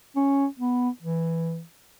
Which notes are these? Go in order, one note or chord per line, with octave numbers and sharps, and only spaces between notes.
C#4
B3
E3